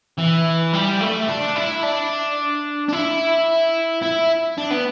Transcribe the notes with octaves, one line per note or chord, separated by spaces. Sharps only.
E3
G3
A3
D4
E4
D4
D4
E4
E4
D4
B3